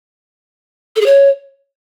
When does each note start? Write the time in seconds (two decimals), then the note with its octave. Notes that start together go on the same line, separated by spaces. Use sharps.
0.96 A4
1.01 G#4
1.06 C#5